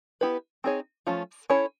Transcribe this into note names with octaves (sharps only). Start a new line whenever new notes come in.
B3 E4 G4 B4
C4 D#4 G#4 C#5
F3 A3 C#4 F4
C#4 E4 A4 C#5